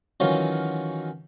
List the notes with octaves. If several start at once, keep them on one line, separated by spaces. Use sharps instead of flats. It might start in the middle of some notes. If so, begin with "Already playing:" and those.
D#3 E3 F#3 C#4 F4